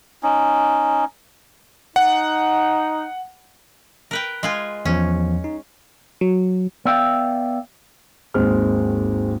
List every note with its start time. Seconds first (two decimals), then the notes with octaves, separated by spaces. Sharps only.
0.23 C#4 D#4
1.96 D#4 F#5
4.11 A#4 B4 G5
4.43 G#3 F4 G#5
4.85 E2 F3 C#4
5.44 D#4
6.21 F#3
6.85 B3 D5 E5 F5 G5
8.34 G#1 D#2 G#3 C4 C5 F6